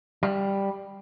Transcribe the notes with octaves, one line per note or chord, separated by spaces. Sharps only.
G3